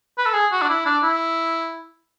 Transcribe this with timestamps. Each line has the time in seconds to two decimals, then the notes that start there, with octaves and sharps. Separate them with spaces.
0.18 B4
0.26 A4
0.34 G#4
0.52 F#4
0.62 D4
0.69 E4
0.85 D4
1.03 E4